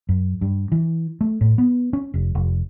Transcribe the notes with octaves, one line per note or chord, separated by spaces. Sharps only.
F#2
G2
E3
A3
A2
B3
C#4
F1
F1